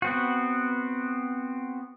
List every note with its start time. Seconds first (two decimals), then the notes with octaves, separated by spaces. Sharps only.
0.02 B3 C4 F#4